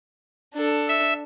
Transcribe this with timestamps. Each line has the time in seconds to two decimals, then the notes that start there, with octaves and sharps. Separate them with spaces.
0.54 D4 A4
0.88 E5